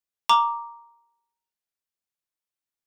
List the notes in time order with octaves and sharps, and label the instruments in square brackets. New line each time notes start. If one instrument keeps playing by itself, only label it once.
[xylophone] A#5 D6